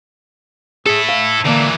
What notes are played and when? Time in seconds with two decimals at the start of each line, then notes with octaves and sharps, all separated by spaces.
0.86 E4 G#4 A4
1.09 F5
1.45 A#2 D3 E3 A#3